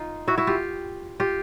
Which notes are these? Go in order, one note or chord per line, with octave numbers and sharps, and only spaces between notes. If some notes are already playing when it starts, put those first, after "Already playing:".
Already playing: D#4 F4
E4 F#4
E4 F#4
F4 G4
F4 G4